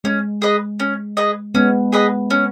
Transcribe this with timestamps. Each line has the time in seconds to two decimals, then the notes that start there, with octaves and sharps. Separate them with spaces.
0.04 G#3 C#4
0.42 G#4 B4 D#5
0.80 C#4
1.17 G#4 B4 D#5
1.54 G#3 B3 C#4
1.93 G#4 B4 D#5
2.30 C#4